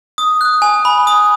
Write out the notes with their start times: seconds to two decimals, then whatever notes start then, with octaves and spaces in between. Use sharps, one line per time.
0.18 D#6
0.41 F#6
0.62 G#5
0.85 B5
1.07 D#6